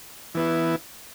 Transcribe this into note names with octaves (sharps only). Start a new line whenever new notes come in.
E3 B3 E4